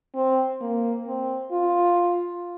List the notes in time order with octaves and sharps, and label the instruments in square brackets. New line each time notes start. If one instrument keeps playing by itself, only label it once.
[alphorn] C4
A#3
C4
F4